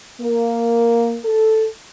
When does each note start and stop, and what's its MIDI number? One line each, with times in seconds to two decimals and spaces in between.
0.21 1.17 58
1.25 1.66 69